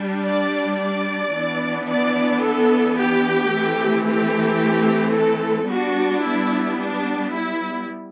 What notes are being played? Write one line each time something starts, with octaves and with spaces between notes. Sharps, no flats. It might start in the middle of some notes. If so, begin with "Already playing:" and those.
Already playing: G3 D4
D5
D5
E3 B3 D4
D5
A4
G4
E3 A3 C4
G4
A4
G3 B3 D4 F#4
E4
D4
E4